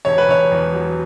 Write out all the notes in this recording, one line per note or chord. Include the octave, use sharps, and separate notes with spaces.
E1 C#5
B4
E1 C#5
E2
F#3